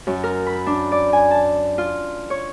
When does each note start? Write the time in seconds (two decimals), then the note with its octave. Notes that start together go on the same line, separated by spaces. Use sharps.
0.07 F#2
0.24 A#4
0.47 B5
0.66 D4
0.92 D5
1.13 G#5
1.31 A5
1.78 F4
2.30 C#5